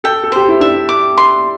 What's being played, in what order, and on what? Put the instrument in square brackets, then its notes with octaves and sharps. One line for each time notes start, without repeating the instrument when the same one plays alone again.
[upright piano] A4 [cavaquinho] G5
[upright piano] A4
[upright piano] G4 [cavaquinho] C5
[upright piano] E4
[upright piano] D4 [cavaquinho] E5
[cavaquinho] D6
C6